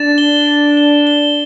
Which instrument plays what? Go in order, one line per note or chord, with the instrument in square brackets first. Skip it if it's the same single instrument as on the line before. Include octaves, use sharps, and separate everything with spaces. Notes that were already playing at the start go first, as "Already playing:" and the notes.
Already playing: [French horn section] D4 [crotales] A6 E7
[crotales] G7
A6
G7
G7